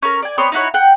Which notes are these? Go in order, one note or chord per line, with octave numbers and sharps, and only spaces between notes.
C#4 A#4
D5 G#5
B3 C4 C#5 C6
D#4 E4 F#4 C#5
F#5 G5